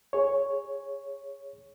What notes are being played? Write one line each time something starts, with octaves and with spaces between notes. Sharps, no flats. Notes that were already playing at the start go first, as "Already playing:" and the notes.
G#4 C#5